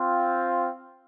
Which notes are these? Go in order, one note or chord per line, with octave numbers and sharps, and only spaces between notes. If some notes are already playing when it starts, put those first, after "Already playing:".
Already playing: C4 F4